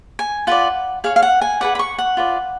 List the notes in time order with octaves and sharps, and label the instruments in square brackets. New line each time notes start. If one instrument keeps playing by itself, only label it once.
[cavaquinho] G#5
F4 B4 D5 F#5
G#4 C#5 F5
F5
F#5
G#5
G#4 B4 D5 F#5
B5
C#6
F#5
F4 B4 D5